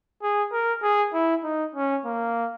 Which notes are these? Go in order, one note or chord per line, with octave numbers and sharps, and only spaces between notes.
G#4
A#4
G#4
E4
D#4
C#4
A#3